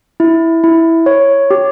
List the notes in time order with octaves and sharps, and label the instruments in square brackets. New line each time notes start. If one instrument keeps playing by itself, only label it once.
[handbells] E4
E4
C#5
G4